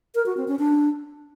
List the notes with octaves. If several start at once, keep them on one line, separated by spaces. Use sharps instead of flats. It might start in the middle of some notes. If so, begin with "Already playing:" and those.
A#4
F#4
C4
C#4
D4